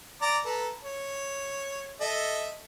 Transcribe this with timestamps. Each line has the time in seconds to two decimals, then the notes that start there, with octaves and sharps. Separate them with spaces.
0.21 D5 A#5 D6
0.45 A4 B4 A#5
0.83 C#5
2.01 A4 D#5 E5